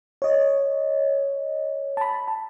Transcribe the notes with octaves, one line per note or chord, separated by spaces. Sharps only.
C#5 D#5
A5 B5
A5